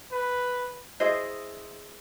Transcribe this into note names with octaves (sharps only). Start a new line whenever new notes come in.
B4
E4 G#4 C5 D#5